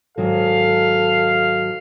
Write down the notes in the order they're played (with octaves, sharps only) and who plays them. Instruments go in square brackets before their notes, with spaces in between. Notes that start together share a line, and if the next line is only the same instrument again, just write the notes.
[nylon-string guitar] G#2 D#3 F#3 [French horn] A4 [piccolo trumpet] F5